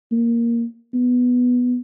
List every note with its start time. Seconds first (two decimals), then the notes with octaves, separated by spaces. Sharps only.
0.12 A#3
0.94 B3